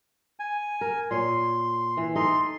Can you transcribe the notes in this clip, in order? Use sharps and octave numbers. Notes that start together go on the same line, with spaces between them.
G#5
A#4
A#2 C#5 C6
E3
D#4 A4 D#5 C6